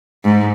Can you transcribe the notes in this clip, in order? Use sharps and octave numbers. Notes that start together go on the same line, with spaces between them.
G#2